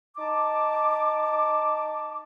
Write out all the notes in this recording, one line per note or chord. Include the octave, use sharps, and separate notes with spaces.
D#4 A5 D6